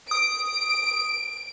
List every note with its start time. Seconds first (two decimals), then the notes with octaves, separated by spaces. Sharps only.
0.11 D#6 D7